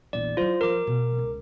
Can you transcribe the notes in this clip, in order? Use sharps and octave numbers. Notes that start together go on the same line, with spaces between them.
A#1 E2 D5
F#3 E4 F4 C5
F3 A#4 D6
B2
C#2